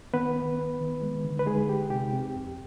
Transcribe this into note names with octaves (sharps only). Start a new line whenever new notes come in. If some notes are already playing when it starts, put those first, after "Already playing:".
D#3 B3 B4
B3
B3
D#3
G#3
D3
B4
G#3 D#4 G#4
G#3 G4
C3 G4
C4
F2